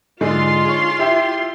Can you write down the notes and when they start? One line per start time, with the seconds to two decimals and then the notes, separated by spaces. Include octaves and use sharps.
0.21 G#2 D3 G#3 F4 C6
0.65 G#4 C#5
0.99 E4 G4 E5